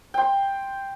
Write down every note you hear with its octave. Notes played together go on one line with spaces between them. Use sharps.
G5 C6